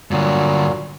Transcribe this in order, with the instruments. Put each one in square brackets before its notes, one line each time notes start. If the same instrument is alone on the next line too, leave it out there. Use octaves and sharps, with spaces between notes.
[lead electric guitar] G2 D3 [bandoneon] A#2 F#3